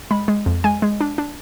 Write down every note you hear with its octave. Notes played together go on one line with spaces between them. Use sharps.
G#3 B5
G#3
F2
G#3 G#5
G#3
D4
D4